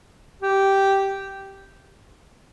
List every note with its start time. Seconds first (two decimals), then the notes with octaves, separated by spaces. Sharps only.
0.42 G4